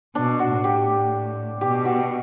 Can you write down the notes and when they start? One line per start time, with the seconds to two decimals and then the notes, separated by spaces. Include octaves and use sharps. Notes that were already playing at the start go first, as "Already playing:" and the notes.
0.15 B2 D4
0.39 F#4
0.52 A2
0.64 G4
1.61 B2 G4
1.85 F#4